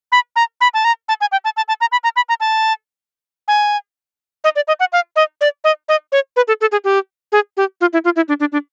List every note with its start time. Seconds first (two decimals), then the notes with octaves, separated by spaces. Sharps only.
0.12 B5
0.36 A#5
0.61 B5
0.74 A5
0.85 A#5
1.09 A5
1.21 G#5
1.32 G5
1.45 A5
1.57 A5
1.68 A5
1.81 A#5
1.92 B5
2.04 A#5
2.16 B5
2.29 A#5
2.40 A5
3.48 G#5
4.44 D#5
4.56 D5
4.68 D#5
4.80 F#5
4.93 F5
5.16 D#5
5.41 D5
5.64 D#5
5.89 D#5
6.12 C#5
6.36 B4
6.48 A4
6.61 A4
6.72 G#4
6.84 G4
7.32 G#4
7.57 G4
7.81 F4
7.93 E4
8.05 F4
8.16 E4
8.28 D4
8.40 D4
8.52 D4